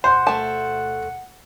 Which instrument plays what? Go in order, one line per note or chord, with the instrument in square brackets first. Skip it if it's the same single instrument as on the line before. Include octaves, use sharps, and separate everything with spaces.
[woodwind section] D2 B2 F#5 [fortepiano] C5
[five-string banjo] A3 A5